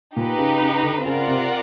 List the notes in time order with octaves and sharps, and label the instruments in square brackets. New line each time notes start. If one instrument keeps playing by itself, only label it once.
[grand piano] A#2 [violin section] D#4 G4 B4
[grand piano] C#3
C#3
D3
[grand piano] C#3 [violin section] C4 F4 A#4 D5 F#5
[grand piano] C3